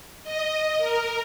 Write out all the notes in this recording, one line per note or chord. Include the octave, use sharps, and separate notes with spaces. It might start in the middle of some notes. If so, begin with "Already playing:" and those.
D#5
A#4